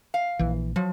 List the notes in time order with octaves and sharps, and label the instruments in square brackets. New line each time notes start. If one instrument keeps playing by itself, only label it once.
[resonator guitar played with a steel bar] F5
[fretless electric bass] A#1 E3
[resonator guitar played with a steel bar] F3 [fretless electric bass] F#3